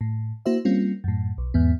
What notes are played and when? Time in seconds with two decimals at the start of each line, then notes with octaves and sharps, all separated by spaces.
0.01 A2
0.46 A#3 E4 F#4 C5 E5
0.65 G3 A#3 C4 C#4 F4
1.04 F#2 A2
1.38 B1
1.54 E2 G#2 B3